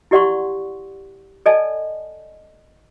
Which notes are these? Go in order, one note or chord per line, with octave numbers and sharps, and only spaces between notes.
E4 G4 D5 F#5 C6 C#6
A4 D5 D#5 G#5 A5